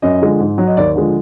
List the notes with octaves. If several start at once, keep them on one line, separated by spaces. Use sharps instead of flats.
F#2 D#5
D3 F3 G#3
G#2
F#3
D#5
D#2 D5
D3 F3 G#3